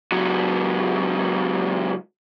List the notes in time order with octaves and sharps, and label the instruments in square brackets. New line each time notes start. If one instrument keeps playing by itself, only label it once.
[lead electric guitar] C#2 F#3